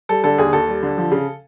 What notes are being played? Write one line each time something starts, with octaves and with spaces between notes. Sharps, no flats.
G3 A4
D3 A4
D#2 G#4
D#2 A4
G3
D3
F3
C#3